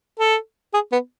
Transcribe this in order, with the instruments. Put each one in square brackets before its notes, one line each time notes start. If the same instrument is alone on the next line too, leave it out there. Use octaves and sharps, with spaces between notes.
[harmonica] A4
G#4
B3